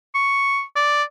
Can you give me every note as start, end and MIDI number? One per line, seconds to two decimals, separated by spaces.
0.15 0.62 85
0.76 1.03 74